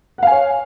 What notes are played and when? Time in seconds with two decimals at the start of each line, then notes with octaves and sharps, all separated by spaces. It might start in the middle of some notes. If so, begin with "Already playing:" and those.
0.18 F#5
0.23 F5
0.27 G#5
0.31 C#5